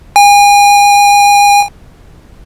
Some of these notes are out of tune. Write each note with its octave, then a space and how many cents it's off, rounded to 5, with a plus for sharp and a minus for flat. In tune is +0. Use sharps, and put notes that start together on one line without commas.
G#5 -35